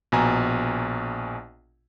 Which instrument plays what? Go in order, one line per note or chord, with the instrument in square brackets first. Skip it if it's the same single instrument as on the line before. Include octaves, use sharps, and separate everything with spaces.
[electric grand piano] A#1 B2 G#5 A#5